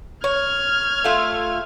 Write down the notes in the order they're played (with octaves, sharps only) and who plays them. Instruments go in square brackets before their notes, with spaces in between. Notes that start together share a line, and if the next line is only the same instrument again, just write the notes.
[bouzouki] C#5 [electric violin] F6 G#6
[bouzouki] A3 F4 A4